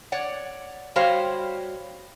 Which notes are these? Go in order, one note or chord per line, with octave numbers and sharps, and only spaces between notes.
C#5 D5 F#5
G3 F#4 G4 C5 C#5 F5